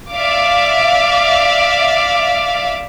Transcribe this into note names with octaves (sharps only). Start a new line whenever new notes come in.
D5 E5 F5 D6